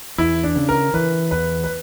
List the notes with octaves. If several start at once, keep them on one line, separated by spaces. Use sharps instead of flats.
E2 E4
D4
C#3
A#4
E3 B4
E2 B4
B4